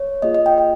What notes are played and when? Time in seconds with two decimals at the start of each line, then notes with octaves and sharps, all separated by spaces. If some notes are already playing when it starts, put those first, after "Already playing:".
Already playing: C#5
0.22 A#3 F4 G#4 D#5
0.35 D#5
0.46 G5
0.58 G5